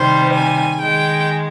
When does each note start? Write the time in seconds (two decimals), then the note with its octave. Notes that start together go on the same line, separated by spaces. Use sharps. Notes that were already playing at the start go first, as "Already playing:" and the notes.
Already playing: C3 D#3 G3 C5
0.33 G#5
0.81 D#3 G#3 G5